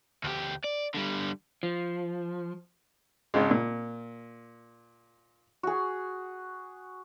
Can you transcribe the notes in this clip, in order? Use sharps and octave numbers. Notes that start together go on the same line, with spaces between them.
D2 G4
D5
D3 G3
F3
G#1 C#3 G#3
A#2
F#4 G#4